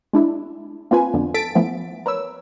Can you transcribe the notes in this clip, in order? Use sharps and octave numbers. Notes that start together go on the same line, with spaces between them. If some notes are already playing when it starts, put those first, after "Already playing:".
G#3 D4 E4
A#3 C4 F4 B4 G#5
F2 B2 D3
A4 A6 B6 D7
E3 F3 A3 B3
A#4 B4 C#5 E6